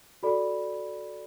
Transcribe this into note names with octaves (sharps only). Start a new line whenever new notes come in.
F#4 A4 D5 B5